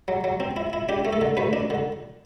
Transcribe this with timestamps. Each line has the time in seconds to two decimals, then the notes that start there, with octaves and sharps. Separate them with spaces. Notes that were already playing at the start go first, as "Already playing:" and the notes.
0.08 F#3
0.24 F#3
0.40 C4
0.57 E4
0.73 E4
0.89 D4 G4
1.05 A3
1.13 A4
1.21 D3
1.37 D2 B4
1.53 D4
1.70 D3